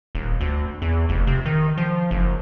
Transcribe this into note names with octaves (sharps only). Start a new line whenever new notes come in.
D#1
D2
E2
F1
C3
D#3
F3
F#1